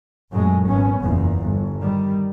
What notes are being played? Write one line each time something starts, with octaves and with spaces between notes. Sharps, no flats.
F#2 A#2 F#3 G#3 A3
G#1 B3 C#4
F#1 E2 A#2
G1
D#3 G3